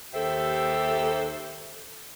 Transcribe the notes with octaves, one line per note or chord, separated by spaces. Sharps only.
D#2 G4 A4 C5 E5